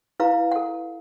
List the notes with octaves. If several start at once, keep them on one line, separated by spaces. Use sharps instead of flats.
E4 B4 F5 A#5
A4 F#5